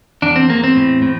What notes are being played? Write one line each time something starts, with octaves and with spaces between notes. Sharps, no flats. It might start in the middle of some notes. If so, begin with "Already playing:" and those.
E2 D4
C4
E2 A#3
C4
A2
A2